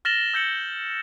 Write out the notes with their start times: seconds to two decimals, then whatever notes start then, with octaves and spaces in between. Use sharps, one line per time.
0.05 F6 A6 A#6 E7 F#7 G7
0.34 E6 G6 A#6 C#7 F#7